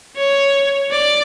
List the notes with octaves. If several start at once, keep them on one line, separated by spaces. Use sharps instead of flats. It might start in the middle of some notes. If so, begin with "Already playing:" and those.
C#5
D5